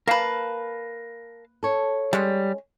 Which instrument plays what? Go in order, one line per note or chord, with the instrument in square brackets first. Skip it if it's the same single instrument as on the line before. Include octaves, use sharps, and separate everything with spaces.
[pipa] A#3 B4 [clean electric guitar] A#4 F5 A5
[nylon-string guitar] A4 C#5
[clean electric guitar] G3 [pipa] G#3 C#4